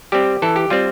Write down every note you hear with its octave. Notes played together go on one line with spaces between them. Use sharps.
G3 C4 G4
E3 A4
G4
G3 C4 F4